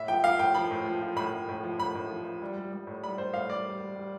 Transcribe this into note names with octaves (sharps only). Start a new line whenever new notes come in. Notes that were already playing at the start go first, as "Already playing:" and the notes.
Already playing: A2 E5
F3 G5
F3 F5
A2 G5
F3 B5
A2
F3
F3
A2 B5
A2
A2
F3
A2 B5
A2
F3
F3
G3
G3
G3
A2
G3 B5
A2 C5
A2 F5
G3 D5
G3
G3
G3